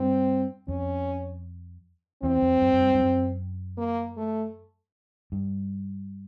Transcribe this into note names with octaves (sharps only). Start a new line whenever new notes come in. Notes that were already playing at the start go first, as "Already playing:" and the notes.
Already playing: G2 C4
F2 C#4
E2 C4
F2
F#2
F#2
G2
G2
F#2
A#3
A3
G2